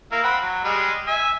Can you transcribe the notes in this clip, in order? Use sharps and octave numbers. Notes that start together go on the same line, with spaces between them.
A#3 E4
C4 F#5 B5
F#3
G3 G#3
E5 G#5